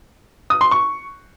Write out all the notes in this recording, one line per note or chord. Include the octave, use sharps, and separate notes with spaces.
D#6
C6
C#6